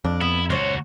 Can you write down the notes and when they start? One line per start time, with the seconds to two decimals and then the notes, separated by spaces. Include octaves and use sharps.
0.05 F2 D4
0.21 B3 E4
0.50 C#2 F#4 C5 C#5